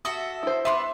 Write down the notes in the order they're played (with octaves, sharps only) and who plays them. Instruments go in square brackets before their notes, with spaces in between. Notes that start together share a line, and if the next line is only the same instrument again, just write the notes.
[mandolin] F#4 A4 E5 [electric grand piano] D#6
[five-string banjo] E4 C5
[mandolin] B3 D5 F#6 [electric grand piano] E5 C6